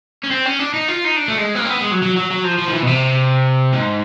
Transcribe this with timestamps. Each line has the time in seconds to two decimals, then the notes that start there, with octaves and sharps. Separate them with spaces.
0.24 C#4
0.31 C4
0.46 C#4
0.59 D4
0.74 D#4
0.88 F4
1.04 D#4
1.16 D4
1.28 A3
1.38 G#3
1.55 B3
1.59 A#3
1.65 C4
1.70 B3
1.81 G#3
1.91 F#3
2.02 F#3
2.16 F#3
2.30 F#3
2.44 F3
2.58 F3
2.68 D#3
2.73 E3
2.83 B2
2.87 C3
3.72 G#2